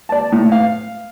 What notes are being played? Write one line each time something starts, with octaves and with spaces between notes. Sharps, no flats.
D5 A5
A2
F5